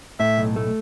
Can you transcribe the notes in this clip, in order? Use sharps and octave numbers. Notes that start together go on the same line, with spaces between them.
A2 E5
B1
A3